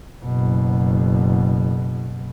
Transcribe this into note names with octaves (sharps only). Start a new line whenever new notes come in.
F#1 B2